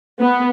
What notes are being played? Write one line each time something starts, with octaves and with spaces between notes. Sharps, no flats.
B3